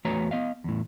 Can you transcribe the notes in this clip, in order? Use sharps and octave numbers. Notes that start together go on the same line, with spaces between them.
E2 A3 F#4 B4 C#5 A#5
B3 D#5 F5
E2 A2